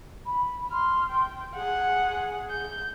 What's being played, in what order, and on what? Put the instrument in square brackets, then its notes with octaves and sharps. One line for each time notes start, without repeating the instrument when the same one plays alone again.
[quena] B5
[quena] C6 [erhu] F6
[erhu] G5
[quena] G#4 [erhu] F#5
[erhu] G6